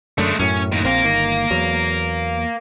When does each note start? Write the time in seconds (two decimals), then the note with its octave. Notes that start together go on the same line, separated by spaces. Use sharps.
0.18 F#2 D3 G#3 A3
0.40 F#2 A2 C#4
0.72 D#2 D#3
0.85 A#1 C4 A#4 F5
1.04 G1 D#3
1.51 E2 F#3